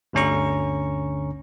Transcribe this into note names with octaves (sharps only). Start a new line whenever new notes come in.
G1 D2 D3 C#4 A#5 C#6